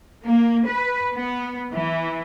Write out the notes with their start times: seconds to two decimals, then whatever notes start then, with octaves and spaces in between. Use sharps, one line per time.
0.24 A#3
0.66 B4
1.13 B3
1.72 E3